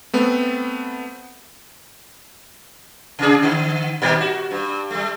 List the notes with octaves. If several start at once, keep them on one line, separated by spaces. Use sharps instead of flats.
A3 B3 C4
C3 D4 G#4
D3
A#2 D#3 G3
F#4
G2
G3 A3